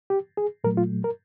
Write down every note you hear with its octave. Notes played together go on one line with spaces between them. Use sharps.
G4
G#4
A#2 F#3 A3 A#4
F4
A#4